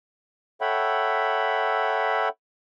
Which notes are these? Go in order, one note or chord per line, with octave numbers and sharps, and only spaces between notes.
A4 C#5 E5 F#5 G5 B5